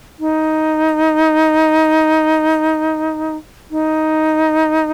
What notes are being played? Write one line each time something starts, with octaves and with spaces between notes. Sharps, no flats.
D#4
D#4